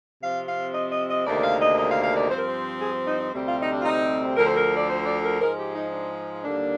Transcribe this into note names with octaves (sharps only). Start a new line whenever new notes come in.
C3 F3 C4 F5
F5
D#5
D#5
D#5
D2 C3 D#3 A#3 D4 D5
F5
D#5
D#5
F5
F5
D5
G2 F3 C4 C5
A#4
C5
G#4
D#4
D#4
D2 C3 G3 C4
F4
D#4
D4
F4
D#4
D2 D3 F3 A#4
C5
A#4
D5
C5
D5
A#4
G#2 F3 G#3 A#4
G4
D#4
D4
D#2 D3 G3 A#3 D4